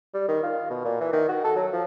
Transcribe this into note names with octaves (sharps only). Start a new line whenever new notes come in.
G3
D#3
F4
B2
A#2
E3
D#3
F#4
A4
F#3
F3